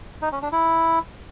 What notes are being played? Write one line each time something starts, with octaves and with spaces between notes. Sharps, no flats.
D#4
C#4
D4
E4